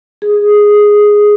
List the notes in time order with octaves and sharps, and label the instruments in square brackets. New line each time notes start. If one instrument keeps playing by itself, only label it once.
[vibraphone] G#4